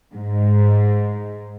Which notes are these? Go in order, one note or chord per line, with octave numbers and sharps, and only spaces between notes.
G#2